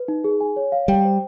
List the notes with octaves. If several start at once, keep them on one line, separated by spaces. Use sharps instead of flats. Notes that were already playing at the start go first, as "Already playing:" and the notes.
Already playing: B4
D#4
G#4
G#5
C#5
F5
G3 G5
C5